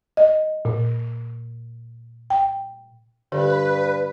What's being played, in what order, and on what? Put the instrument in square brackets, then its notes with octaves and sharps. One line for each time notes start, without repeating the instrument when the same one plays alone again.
[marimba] D#5
A#2
G5
[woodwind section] G2 [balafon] D3 G4 A4 [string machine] B4